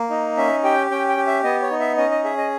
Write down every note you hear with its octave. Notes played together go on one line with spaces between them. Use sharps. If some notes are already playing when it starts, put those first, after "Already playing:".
Already playing: A#3
D#4
C#4 E5
G4 G5
C#4 G5
G5
G4
E5
B3 D#5
C#5
D#4
E5
C#4 D#5
D#5
G#4 E5
D#5